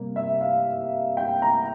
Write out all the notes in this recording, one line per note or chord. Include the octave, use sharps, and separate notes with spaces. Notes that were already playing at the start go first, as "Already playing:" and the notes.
Already playing: C3 G3 A#3
E5
F5
G5
A#5